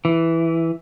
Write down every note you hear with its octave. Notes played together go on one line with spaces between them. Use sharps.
E3